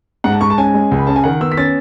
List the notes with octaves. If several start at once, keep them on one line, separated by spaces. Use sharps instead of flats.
G#2 F#5
A5
G#2 C#6
A5
C#4 G#5
G#3
C#2
B5
C#3 A5
G#5
D#3 F#5
B3 E6
B6
C#4 A6